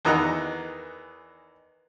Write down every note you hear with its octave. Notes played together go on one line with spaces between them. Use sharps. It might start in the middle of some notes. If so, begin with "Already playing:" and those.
E2 D#3 E3 D#5 F#5 A#5